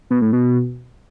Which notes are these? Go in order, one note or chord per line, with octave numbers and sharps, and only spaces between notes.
B2
A2
B2